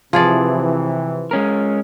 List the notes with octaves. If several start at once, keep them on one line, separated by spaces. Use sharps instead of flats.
C3 E3 F3 G#4 D5
G#3 C#4 A#4